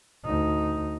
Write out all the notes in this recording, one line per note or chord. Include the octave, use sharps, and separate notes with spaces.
D2 D#4